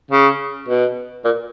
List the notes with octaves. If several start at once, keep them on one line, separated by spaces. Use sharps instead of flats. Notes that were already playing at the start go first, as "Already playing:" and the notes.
C#3
B2
A#2